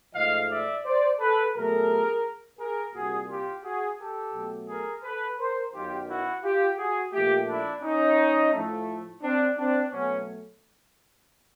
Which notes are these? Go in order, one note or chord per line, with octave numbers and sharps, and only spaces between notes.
G#2 F3 A3 D#5 F5
D5 E5
C5 D5
A4 B4
B2 F#3 A3 G#4 A#4
G#4 A#4
C2 A#2 G3 F#4 G#4
F4 G4
F#4 G#4
G4 A4
B2 F#3 A3
G#4 A#4
A4 B4
A#4 C5
F#2 D#3 F#3 B3 F4 G4
E4 F#4
F4 G4
F#4 G#4
A#2 F3 A3 F4 G4
D4 E4
C#4 D#4
A2 F3 A3
C4 D4
C4 D4
B2 F#3 A3 B3 C#4